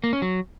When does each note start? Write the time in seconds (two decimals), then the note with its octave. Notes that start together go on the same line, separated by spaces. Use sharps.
0.04 A#3
0.13 C#4
0.22 F#3